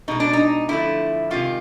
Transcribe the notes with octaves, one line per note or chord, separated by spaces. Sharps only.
B2 G#3 D#4
D4
D#4
D3 F3 A3 E4
C3 D#3 G#3 F4